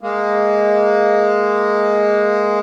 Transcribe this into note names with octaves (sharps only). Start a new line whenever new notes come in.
G#3 A#3